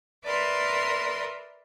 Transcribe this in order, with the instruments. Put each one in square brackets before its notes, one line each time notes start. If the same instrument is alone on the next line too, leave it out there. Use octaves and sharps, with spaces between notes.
[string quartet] A#4 B4 D5 E5 C6